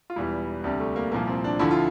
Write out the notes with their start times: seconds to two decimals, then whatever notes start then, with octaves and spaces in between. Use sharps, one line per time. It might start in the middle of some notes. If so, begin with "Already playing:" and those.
0.10 F4
0.16 E1 E2 E3 G3 E4
0.64 D2 C3 G3 D4
0.80 A3
0.96 A#3
1.12 C2 A#2 F3 A#3
1.27 C4
1.44 D4
1.59 D2 D3 F3 E4
1.71 F4